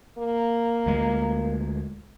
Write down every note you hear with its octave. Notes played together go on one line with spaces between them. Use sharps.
A#3
D2 G#3